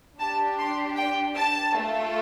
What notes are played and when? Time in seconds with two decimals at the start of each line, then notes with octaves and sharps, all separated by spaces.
0.19 D4 G4 A5
0.58 C6
0.97 G5
1.36 A5
1.75 A3 F4 A4